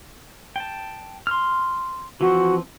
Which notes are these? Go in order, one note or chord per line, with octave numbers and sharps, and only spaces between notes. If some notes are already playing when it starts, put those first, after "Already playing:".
G5 A5
C6 F6
E3 F3 C4 F#4